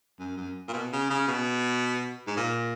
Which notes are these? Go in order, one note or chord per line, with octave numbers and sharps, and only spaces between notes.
F#2
F#2
A#2
B2
C#3
C#3
B2
G#2
A#2